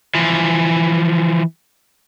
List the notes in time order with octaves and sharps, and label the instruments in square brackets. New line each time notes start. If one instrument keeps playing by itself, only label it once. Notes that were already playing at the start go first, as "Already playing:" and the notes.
[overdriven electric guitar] E3 F3